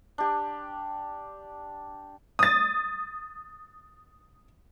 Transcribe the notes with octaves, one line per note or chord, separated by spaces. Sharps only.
D4 G4
D#6 A6